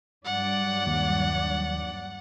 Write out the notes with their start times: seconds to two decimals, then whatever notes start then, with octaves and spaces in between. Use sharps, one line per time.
0.25 G2 F#3 D5 F#5
0.87 D#2